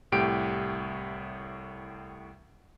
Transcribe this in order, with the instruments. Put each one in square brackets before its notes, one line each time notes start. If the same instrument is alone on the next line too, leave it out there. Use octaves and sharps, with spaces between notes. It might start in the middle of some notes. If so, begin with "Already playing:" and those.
[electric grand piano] C2 A2 G4 D7